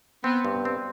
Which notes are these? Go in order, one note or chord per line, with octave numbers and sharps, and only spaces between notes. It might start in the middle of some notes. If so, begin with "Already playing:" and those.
B3 C4
G2
C4